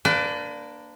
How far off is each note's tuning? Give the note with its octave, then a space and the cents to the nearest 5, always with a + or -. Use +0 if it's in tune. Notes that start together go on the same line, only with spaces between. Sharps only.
A#3 +0 D4 +0 B4 +40